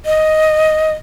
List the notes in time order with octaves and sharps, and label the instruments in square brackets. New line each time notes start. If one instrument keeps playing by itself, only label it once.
[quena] D#5